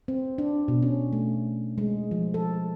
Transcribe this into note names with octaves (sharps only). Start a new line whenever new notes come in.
C4
D4
B2
C#4
A3
G#3
F3
A4